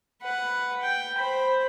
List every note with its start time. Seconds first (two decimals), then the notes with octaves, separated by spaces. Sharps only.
0.22 B4 F#5
0.82 G5
1.17 C5 B5